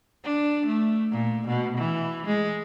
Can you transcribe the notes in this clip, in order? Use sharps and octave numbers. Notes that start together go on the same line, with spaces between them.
D4
A3
A#2
B2
E3
G#3